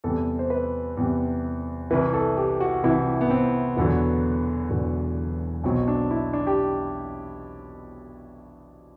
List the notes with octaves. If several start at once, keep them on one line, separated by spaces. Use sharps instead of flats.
E2 C3 G3 A4
C5
B4
E2 C3 G3
C2 C3 E3 B4
A4
G4
F#4
C2 C3 E3 E4
B3
C4
E1 E2 D3 F#3 B3
E1 E2 D3 F#3
B1 B2 F#3 C4
D4
E4
D4
G4